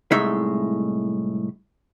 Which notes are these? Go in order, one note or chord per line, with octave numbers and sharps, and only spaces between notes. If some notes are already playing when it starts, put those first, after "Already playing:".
C2 A2 G#3 D#4 E5